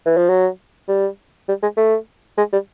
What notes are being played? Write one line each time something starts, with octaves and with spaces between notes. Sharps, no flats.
E3
F3
F#3
G3
G3
G#3
A3
G#3
G3